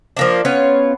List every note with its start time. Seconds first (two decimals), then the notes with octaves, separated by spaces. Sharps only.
0.17 F3 A#3 D4
0.45 B3 C#4 F4 C#5